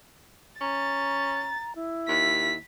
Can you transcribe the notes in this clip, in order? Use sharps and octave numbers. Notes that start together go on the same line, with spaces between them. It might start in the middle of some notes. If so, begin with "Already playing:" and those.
C#4 A#5 A6
E4
D#2 B6